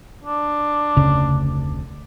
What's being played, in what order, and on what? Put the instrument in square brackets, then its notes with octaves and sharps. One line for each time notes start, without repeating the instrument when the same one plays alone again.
[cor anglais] D4
[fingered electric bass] F1 D2 [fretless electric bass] C#3